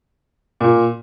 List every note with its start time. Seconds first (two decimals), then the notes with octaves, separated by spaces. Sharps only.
0.60 A#2